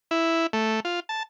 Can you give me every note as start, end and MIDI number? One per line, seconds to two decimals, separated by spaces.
0.11 0.47 64
0.53 0.80 57
0.85 1.00 65
1.09 1.23 81